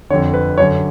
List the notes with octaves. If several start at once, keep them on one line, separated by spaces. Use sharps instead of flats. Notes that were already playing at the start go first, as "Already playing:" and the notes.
F2 D3 C#5
B4
F#2 D3 C#5